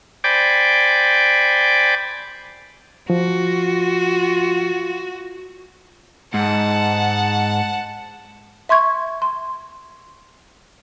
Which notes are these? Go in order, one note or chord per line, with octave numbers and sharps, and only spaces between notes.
C5 D5 G5 G#5 B5 D6
F3 F4 F#4
G#2 F#5 A5
E5 C6 C#6 G#6
C6